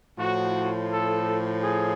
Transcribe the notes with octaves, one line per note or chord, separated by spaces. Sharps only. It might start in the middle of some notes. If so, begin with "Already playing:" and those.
A2 F3 F#4
A4
G#4